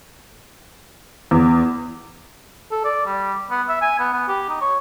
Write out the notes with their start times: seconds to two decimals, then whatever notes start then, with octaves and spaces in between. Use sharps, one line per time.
1.31 E2 B3 D6
2.71 A4
2.85 D5
3.06 G3
3.51 B3
3.69 E5
3.82 G#5
3.99 B3
4.13 B3
4.28 G4
4.49 D#4
4.61 C#5